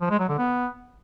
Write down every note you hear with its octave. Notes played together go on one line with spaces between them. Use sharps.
F3
G#3
F#3
D3
B3